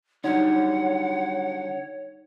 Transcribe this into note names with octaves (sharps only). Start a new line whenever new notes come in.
D3 F#3 G3 D#4 C#5 F#5